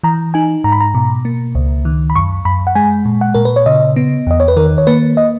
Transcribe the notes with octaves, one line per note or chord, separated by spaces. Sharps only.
E3 A#5
D#4 G#5
G#2 A#5
B5
A#5
B2
A#3
C#2
D#3
B5
F#2 C#6
F#2 B5
F#5
G#3 G#5
A#2
F#5
A#2 A#4
B4
C#5
C#3 D#5
B3
E2 D#5
C#5
B4
D#3 A#4
C#5
A#3 B4
D#5